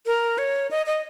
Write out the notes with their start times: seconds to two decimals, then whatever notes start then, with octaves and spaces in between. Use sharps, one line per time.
0.06 A#4
0.38 C#5
0.71 D#5
0.86 D#5